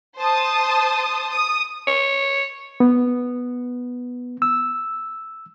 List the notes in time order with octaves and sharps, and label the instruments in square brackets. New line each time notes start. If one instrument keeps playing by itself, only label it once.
[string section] C5 A5 D#6
D#6
[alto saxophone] C#5
[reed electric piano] B3
E6